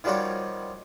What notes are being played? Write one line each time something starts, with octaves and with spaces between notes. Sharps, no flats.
D#3 F3 G3 F#4 C#5